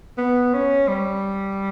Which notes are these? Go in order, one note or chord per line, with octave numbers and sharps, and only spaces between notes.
B3
C#4
G3